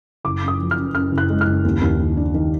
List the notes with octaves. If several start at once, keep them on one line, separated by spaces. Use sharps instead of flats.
F#1 D6
F#2
D#6
F3
F6
F#2
F#2 F6
F#1
F#6
G#3
F6
F#1
D#2
D#2
D#3
D4
D#3